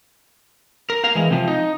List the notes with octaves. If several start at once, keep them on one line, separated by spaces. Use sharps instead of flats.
A#4
A#4 F5
E3 G#3
C3 F3
D#4